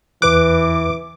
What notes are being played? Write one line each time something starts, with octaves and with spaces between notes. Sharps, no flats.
E2 E3 B4 D6 F#6